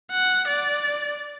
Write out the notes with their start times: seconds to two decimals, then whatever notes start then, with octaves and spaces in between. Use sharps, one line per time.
0.11 F#5
0.47 D5